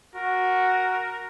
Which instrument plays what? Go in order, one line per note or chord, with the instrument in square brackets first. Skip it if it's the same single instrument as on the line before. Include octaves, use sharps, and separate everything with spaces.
[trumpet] F#4 [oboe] A#4